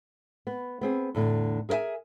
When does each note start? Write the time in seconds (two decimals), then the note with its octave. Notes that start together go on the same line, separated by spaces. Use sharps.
0.47 B3
0.81 B3 C4 G#4
1.15 E2 A2 D3
1.69 G#4 A#4 C#5 E5 G#5